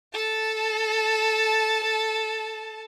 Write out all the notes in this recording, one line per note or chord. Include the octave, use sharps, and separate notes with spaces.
A4 A5